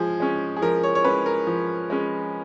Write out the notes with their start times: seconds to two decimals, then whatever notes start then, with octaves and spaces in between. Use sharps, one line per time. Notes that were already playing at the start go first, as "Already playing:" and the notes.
Already playing: F3 G#3 G#4
0.20 G#3 C#4
0.57 G#4
0.62 F3 A#4
0.83 C#5
0.95 C#5
1.04 G#3 C#4 B4
1.26 A#4
1.47 F3
1.90 G#3 C#4